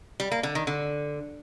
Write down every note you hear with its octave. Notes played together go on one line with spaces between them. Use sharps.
G3
A#3
D3
D#3
D3